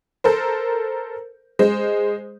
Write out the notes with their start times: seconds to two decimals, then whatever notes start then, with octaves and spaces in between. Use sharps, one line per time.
0.24 A4 A#4 C5
1.59 G#3 C5